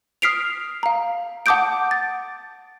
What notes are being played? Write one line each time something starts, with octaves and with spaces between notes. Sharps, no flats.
D#6 F6 B6 C7 D7 F7
F5 A#5
F#5 A5 D6 D#6 G6 D7
A6